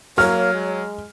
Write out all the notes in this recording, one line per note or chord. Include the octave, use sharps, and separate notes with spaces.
F#3 A#3 C#5 F6
G#3